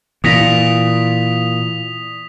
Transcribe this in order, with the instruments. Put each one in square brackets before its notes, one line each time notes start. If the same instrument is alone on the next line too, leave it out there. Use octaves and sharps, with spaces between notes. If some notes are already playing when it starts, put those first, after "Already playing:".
[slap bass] A#2 [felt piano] E3 A#6 [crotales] D#6 B6 F7